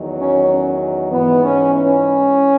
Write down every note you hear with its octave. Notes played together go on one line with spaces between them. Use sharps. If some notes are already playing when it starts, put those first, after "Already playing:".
Already playing: E2 D#3 F#3
C#4
G#2 E3 B3
C#4
C#4